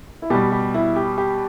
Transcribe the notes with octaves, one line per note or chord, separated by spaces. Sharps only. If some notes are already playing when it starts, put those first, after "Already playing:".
E4
B2 G3 G4
G4
E4
G4
G4